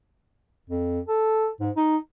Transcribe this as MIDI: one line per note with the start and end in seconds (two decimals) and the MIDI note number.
0.69 0.99 41
1.08 1.48 69
1.60 1.70 44
1.76 1.97 63